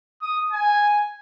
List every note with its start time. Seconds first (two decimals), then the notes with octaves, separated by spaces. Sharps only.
0.22 D#6
0.52 G#5